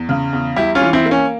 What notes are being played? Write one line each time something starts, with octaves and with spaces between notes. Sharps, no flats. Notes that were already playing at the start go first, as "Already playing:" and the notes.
Already playing: E2
C#3
E2
G3 E4 G4
C#4 F4
E3
C4 E4
A#3
C#4